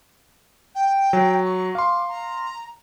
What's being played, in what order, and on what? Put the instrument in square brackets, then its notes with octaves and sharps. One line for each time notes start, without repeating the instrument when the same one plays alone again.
[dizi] G5
[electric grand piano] F#3
[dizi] C#6
[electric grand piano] F5 C6 [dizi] D6
[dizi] A#5